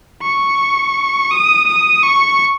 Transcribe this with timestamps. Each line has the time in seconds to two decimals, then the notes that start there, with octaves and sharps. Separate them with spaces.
0.22 C#6
1.31 D#6
1.67 D#6
2.03 C#6